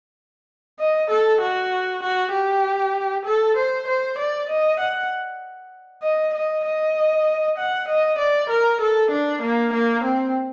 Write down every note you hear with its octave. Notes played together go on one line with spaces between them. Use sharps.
D#5
A4
F#4
F#4
G4
A4
C5
C5
D5
D#5
F#5
D#5
D#5
D#5
F#5
D#5
D5
A#4
A4
D4
A#3
A#3
C4